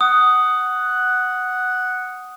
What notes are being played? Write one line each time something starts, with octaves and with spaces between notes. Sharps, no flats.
F#5 D#6